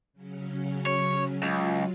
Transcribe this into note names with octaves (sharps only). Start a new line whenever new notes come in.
C#3 F#3 C#4
C#5
C#2 F#3 F4